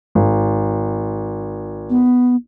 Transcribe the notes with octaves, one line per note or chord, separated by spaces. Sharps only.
G#1
B3